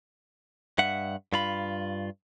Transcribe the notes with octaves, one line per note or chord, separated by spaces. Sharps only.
G2 E5 F#5
G2 F4 B5